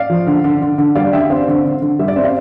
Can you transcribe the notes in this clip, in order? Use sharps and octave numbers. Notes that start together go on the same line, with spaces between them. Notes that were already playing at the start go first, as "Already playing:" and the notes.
Already playing: D5 F5
F3
D3
D3
D3
D3
G3 D5 F5
D3 E5 G5
C4 D5 F5
D3
D3
D3
G3 E5
D5
C4 E5
D5 F5